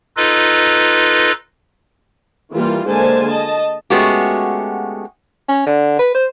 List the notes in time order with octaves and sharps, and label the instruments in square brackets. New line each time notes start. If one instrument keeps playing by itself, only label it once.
[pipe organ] D#4 F4 A4 B4 D#5
[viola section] E3 G3 A#3 F4
D3 G#3 A#3 C5 G#5 A5
D#5 A5
[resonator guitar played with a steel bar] G#3 A3 B3 C#4 F#4 G4
[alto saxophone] C#4
D3
B4
C5